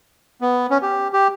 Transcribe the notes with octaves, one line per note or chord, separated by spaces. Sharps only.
B3
C#4
G4
G4